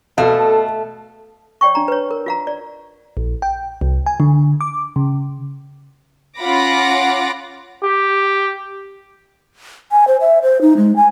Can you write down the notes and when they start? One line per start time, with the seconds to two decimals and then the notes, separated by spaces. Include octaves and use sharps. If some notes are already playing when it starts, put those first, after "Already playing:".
0.18 B2 A3 A4 F5
1.61 C#5 D5 G5 C#6
1.75 D4 A#5
1.88 B4 C#5
2.11 A#4
2.26 F4 F5 A#5
2.47 D5
3.17 A#1
3.42 G5
3.81 C2
4.06 G#5
4.20 D3
4.61 D6
4.96 C#3
6.40 C#4 F4 F#5 B5 D6 A#6
7.84 G4
9.92 G#5
10.07 C5
10.21 E5
10.42 C5
10.61 D#4
10.77 G#3
10.96 G#5